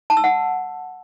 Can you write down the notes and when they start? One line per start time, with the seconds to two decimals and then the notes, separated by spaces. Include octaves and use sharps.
0.10 A5
0.17 E6
0.24 F#5